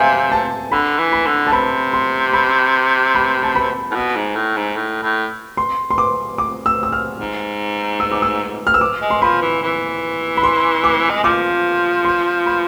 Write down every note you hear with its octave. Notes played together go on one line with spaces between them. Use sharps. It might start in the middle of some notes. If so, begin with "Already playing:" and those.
Already playing: C3 E5 F5 G#5
A5
D3 B5
E3
B5
D3
A5
C3 B5
C6
B5
B5
A5
B5
A2
B2
G#2
A2
G#2
A2
A2
C6
C6
D6
D6
E6
E6
F6
G#2
E6
D6
E6
F6
E6
D6
G#3
C6
F3 B5
E3
E3
B5
C6
D6
G#3
F3 D6
C6
B5